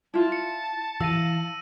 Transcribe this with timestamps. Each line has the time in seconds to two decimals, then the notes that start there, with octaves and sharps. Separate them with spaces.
0.14 E4 F4 A5
0.32 C#7
1.01 E3 F5 E6 A#6 D#7